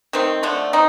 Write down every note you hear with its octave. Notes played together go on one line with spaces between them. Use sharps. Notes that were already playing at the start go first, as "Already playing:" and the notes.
D#3 A3 C4
D3 F3 A3
C4 D#4